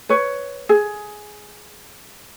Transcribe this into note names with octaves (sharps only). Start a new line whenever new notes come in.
B4 C#5
G#4